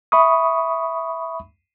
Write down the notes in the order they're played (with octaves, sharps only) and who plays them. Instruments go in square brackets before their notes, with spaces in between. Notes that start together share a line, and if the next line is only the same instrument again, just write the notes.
[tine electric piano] E5 B5 C#6 D#6